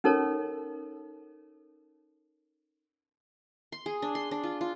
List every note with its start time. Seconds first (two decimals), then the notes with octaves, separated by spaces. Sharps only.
0.04 C#4 D#4 A4 A#4 C#5
3.72 C6
3.86 G#4
4.02 D4
4.15 C6
4.31 D4
4.43 F4
4.61 F4